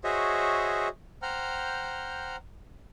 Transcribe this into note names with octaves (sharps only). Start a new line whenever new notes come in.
F#4 G#4 C5 C#5 D#5 E5
C5 F#5 G5 A#5 F6